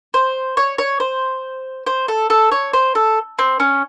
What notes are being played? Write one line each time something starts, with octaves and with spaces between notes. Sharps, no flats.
C5
C#5
C#5
C5
C5
A4
A4
C#5
C5
A4
C4
C#4